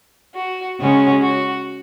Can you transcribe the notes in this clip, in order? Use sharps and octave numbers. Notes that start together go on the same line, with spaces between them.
F#4
C#3 G#3 C#4 F#4
F#4